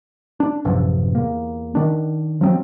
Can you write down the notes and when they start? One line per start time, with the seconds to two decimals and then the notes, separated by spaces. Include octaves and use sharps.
0.40 D4
0.65 A1 F#2 C3 F3
1.15 E2 A#3
1.75 D#3 D4
2.41 F3 F#3 A3 C4